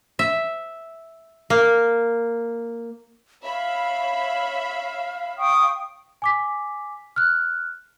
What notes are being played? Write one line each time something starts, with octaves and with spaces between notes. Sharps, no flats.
E5
A#3
C#5 E5 F5 B5
G5 C#6 D#6
G#5 D6 B6
F6 F#6